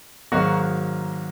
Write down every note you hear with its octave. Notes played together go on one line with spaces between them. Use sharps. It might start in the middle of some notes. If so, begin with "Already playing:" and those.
G#2 D#3 F#3 A#3 F#4